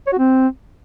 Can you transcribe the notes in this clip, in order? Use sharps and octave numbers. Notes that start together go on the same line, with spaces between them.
C#5
F#4
C4